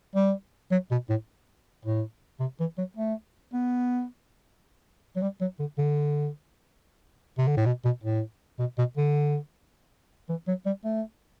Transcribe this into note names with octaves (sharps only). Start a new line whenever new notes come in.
G3
F#3
B2
A2
A2
C3
E3
F#3
A3
B3
F#3
G3
F#3
D3
D3
C3
D3
A2
B2
B2
A2
B2
B2
D3
E3
F#3
G3
A3